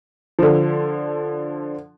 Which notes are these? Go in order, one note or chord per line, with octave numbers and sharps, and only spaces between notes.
D3 F3